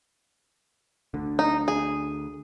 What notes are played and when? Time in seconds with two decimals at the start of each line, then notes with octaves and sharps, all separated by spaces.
1.14 D2 D3
1.39 D#4
1.68 G#4